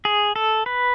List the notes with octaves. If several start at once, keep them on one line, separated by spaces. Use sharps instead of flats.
G#4
A4
B4